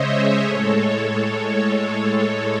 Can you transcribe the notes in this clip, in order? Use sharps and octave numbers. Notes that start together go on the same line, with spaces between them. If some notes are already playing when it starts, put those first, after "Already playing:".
Already playing: C#3 G#3 C5 C#5 D#5 E5
C5 D#5
A2 G#3 A4 C#5
A4 C#5